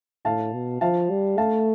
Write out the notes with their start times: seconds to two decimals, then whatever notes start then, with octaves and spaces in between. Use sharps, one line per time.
0.25 A2 F5 A5
0.54 B2
0.81 F3 F5 A5
1.10 G3
1.38 A3 F5 A5